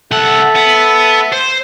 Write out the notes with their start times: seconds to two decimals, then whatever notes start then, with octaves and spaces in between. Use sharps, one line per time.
0.11 C2 A4 E5 F#5
0.56 B3
1.32 C5